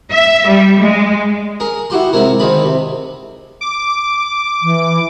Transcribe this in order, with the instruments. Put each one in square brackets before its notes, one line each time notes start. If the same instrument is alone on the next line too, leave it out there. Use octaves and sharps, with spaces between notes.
[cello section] E5
G3
G#3
[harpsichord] G#4 A#4
E4 F#4 G4 C6
C3 G#3 C4 E4 A#4
D2 D#3 C4 G#4 B5
C3
[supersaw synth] D6
[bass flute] E3